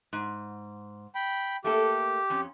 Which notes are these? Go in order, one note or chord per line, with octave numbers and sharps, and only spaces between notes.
G#2
G5 B5
A3 A#3 G4 A4
F2 C#4